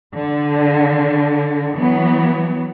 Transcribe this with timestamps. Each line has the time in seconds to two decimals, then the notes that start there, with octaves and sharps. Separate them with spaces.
0.14 D3
1.77 E3 F#3 B3